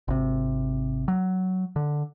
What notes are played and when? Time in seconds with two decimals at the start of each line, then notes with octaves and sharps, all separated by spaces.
0.08 G#1 C3
1.08 F#3
1.76 D3